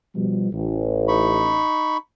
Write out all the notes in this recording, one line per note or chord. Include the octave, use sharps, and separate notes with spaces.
B2 F3 G3
A1
D#4 B5 C#6